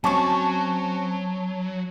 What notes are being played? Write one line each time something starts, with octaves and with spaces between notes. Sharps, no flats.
F#3 C4 C#4 A5 C#6